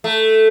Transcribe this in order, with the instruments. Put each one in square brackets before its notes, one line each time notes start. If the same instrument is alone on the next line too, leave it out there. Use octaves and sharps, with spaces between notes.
[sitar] A3